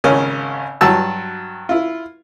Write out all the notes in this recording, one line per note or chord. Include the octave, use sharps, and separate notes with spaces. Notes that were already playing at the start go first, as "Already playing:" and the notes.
G#1 C#3 C#4 A#4
G2 F#3 F#4 A5 E6
E4 F4